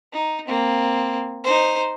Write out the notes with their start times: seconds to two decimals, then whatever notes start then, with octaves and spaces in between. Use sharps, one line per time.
0.13 D#4
0.48 A#3 C4
1.44 D#4 C5